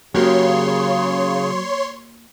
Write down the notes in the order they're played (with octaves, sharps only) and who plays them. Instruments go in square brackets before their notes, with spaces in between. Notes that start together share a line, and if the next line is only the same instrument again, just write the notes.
[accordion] C#3 [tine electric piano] F#3 [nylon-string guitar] A#3 F#4 G4 [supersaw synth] C#5 C6